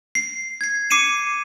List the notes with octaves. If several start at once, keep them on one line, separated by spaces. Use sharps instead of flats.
C7
G#6 C7
D6 C7 C#7 D#7 E7